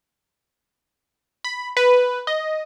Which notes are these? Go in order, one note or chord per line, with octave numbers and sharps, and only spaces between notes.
B5
B4
D#5